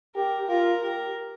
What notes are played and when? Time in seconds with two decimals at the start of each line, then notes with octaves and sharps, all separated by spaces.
0.14 G4 A#4
0.48 F4 A#4
0.82 G4 A#4